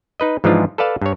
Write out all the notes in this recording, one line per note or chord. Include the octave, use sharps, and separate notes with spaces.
D#4 B4 D#5
G#2 E3 F3 G#3 D4 F4
A4 B4 D5 F5 A5
G2 C#5